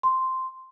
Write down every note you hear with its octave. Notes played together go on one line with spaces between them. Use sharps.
C6